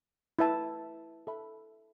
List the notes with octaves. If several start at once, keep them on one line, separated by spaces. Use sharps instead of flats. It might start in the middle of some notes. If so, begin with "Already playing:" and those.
E4 B4 E5 A5
A4 E5 B5